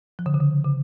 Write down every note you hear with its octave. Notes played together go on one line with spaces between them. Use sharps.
F3
D3
C#3
D3
C#3